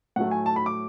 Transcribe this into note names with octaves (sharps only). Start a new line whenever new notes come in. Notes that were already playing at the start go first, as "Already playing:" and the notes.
A2 F#3 A3 F#5
G#5
A5
B5
D6